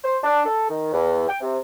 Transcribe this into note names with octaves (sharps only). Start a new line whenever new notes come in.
C5
D4
A4
D#3
E2
G5
C3